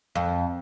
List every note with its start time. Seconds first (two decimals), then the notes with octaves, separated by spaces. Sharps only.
0.15 F2